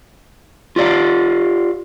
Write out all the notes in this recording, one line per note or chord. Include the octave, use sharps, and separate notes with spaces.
F4 G4 D5 F5